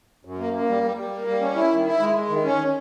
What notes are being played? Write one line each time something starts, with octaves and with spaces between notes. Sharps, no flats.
F#2
A#3
A#3
G3
G3
G3
A#3
G3
C#4
E4
D#3
E4
G#3
G#3
D#3
C#4